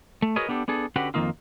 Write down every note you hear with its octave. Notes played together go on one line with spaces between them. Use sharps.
A3
F#4 G#4 A#4 B4 C#5 D#5
B3 D4 G4 A4
B3 D4 G#4 A4
D3 C#4 F#4 G4 B4 F#5
F2 C3 D#3 A#3 D#4 F4